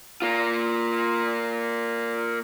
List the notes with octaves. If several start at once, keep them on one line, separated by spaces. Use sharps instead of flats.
A#3 F4